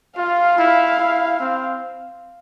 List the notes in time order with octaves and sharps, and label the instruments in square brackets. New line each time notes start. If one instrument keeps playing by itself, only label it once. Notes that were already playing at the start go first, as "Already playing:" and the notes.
[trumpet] F4 [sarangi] F5
[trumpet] E4
E4
C4